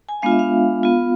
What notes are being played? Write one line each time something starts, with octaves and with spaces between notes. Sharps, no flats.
G#5
G#3 B3 D4 F4 F5
E5
F5
B3 F4